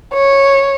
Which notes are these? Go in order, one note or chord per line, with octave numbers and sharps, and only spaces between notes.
C#5